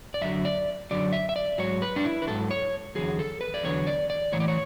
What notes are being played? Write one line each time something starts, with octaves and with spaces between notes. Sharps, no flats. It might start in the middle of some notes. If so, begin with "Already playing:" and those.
D5
F#2 D3 F#3 E5
D5
F#2 D3 F#3 D5
E5
E5
D5
G#2 F#3 C#5
B4
D4
E4
B4
G#2 F#3 A4
C#5
E2 D3 F#3 G#4
A4
B4
D5
E2 D3 F#3 C#5
D5
D5
A2 E3 C#5
D5
C#5